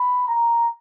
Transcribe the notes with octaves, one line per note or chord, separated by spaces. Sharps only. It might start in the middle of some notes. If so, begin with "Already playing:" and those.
Already playing: B5
A#5